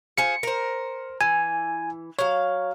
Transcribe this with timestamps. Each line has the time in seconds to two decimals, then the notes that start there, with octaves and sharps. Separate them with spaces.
0.18 F4 G#4 C5 C#7
0.43 A#4 C5
1.21 E3 G#5
2.19 F#3 C#5 F5